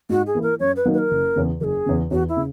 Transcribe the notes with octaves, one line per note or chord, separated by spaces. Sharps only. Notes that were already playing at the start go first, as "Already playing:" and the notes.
G#2 F#4
G#4
E3 A#3 E4
A#4
F#2 C#5
B4
D#3 F#3 A#3 D#4
B4
A#4
F#1
E2 C#3
F#1 G#4 A#4
E2 C#3
E2 F#4
E4
C#3